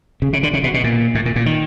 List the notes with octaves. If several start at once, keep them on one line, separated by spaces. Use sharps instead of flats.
C#3
C#3
D3
C#3
B2
B2
A#2
A2
A#2
A#2
D#3